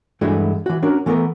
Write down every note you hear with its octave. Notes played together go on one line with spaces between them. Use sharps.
G2 E3 G#3 A3 D4 F#4
E3 F#4
C#4 D4 F#4 A#4
E3 A3 B3 A4 A#4